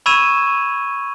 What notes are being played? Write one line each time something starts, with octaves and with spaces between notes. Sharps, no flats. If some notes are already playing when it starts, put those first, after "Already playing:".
B5 C#6 E6 G#6 D#7 E7